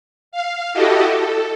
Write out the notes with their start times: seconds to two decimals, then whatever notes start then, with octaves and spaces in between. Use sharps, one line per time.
0.32 F5
0.73 E4 F#4 G4 A4 D#5
1.16 A4